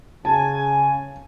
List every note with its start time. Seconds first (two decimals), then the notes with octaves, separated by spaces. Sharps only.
0.25 C#3 G#5 A5